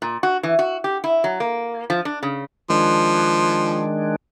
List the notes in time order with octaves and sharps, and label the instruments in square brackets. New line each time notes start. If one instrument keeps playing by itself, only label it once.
[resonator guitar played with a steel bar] A#2
F#4
E3
F#4
G4
E4
F#3
A#3
F3
D4
C#3
[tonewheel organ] D#3 G#3 D4 [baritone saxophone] F3